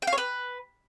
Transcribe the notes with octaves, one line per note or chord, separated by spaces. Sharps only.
G5
F5
C#5
B4